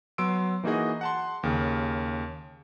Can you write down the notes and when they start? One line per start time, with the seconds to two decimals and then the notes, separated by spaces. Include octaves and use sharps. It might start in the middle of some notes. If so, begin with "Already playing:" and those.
0.18 F#3 B3 C6 E6 D7
0.64 E3 A#3 D#4 F#4 G#4 D#5
1.01 F#5 A5 C6
1.43 D#2 C#3